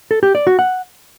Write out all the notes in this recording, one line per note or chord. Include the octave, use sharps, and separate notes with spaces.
A4
G4
D5
F#4
F#5